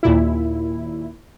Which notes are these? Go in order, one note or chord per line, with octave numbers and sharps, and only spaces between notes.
D#2 A#2 E4